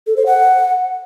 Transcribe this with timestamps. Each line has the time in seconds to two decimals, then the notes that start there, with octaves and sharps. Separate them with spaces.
0.07 A4
0.17 C5
0.26 F#5